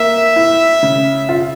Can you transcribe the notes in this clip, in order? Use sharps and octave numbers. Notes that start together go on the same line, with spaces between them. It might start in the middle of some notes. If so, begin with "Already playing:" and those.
Already playing: A#3 E5
E4
C#3
F4